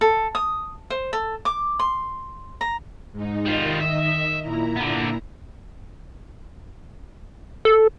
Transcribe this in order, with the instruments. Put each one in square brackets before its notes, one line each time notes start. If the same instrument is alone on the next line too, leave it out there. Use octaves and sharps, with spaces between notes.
[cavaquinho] A4
D#6
C5
A4
D6
C6
A#5
[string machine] G#2 D#4
[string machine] D#3 D#5 [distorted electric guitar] G3 F4
[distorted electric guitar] E5
[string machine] A#2 E4 A#5
[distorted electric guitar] D3 B3
[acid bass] A4